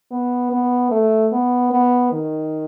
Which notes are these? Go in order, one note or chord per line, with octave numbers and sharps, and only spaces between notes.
B3
B3
A3
B3
B3
D#3